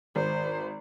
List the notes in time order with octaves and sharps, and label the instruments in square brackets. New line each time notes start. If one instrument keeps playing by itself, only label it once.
[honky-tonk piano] G#1 [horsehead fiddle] C5